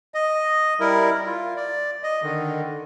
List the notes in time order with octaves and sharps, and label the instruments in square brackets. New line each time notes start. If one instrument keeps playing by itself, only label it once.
[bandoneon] D#5
G3 E4 A#4
F4
D5
D#5
D3 D#3